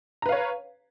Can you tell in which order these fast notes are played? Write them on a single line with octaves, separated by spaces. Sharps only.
A#5 B4 F5 C#5